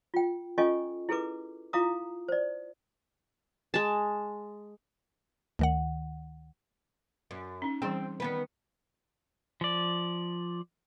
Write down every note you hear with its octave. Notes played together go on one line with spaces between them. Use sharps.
F4 G5
C#4 F4 A4 D#5 G#5 C#6
E4 G#4 A4 B4 D6
E4 F4 F5 A#5 D6 D#6
C5 D5
G#3 A5
D2 D#3 F#5
F#2
C#4 D#4
E3 G3 C4 G#4
D#3 B3 B4
F3 D5